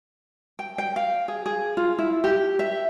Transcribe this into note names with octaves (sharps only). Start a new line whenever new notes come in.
G5
G5
F5
G#4
G#4
F4
E4
G4
E5